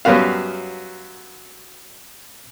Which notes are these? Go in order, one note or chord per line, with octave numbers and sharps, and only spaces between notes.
F#2 F#3 G3 B3 F#4 F5